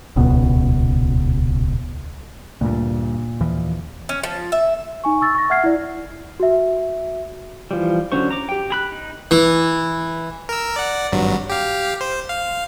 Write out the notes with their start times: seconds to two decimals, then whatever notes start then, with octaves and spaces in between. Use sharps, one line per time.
0.16 D#1 C#2 B2
2.61 D2 G2 A#2
3.40 D#2 E3 F3
4.09 C#4
4.23 F3
4.52 E5
5.04 D#4 G#5 C#6
5.21 C#6 E6 A6
5.35 C#6 A#6
5.50 E5 F#5 F6 G#6 C7
5.64 E4 D5
6.40 F#4 E5
7.71 E3 F3 G3
8.12 D3 F#3 C#4 C5 C#6
8.31 A#5 D6
8.49 G4 G5
8.70 G#4 B5 F#6
8.92 D#4
9.31 E3
10.49 A#4 E6
10.76 D5 F#5
11.12 G#1 G2 F#3
11.50 G4 F5
12.01 C5
12.29 F5